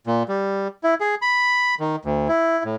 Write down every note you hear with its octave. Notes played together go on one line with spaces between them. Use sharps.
A#2
G3
E4
G#4
B5
D#3
D2
E4
A2